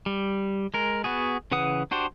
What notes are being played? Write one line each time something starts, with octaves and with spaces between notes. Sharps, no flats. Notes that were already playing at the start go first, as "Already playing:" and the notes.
G3
G#3 A#4
B3 F#4 G#4
C#3 E3 B4 F#5 D#6
D4 F#4 G4 C5